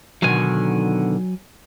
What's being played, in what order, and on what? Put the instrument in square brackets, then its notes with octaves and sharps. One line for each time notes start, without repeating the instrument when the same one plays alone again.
[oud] B2 D3 D#3 [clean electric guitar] F#3 G#5